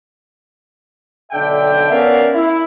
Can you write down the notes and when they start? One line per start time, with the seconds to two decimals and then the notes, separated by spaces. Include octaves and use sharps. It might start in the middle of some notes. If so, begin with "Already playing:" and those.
1.32 B1 D3 D4 E5 G5
1.89 B3 C#4 A#4 D5 E5 F5
2.34 E4